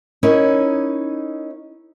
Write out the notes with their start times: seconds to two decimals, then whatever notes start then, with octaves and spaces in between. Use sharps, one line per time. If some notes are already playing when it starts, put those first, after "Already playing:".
0.23 C#4 D#4 E4 A#4 C#5